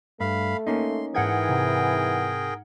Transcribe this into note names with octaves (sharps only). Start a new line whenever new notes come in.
G2 A3 F5 B5
A#3 C#4 D#4 C6
G#2 E3 G#4 A#4 F#5 G5 G#6
C3